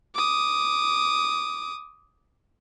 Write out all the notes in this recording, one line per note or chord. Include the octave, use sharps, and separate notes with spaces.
D6 D#6